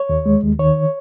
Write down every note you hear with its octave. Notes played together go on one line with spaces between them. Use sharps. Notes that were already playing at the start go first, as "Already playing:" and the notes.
Already playing: C#5
D#2
G#3
D#2
D#3 C#5